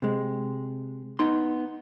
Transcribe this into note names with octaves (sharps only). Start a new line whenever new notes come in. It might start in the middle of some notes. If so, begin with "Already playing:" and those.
C3 G#3
B3 D#4 C6